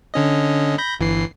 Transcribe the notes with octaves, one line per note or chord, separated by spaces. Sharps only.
D3 C#4 D#5
B5 G6 A#6
G1 E3 C7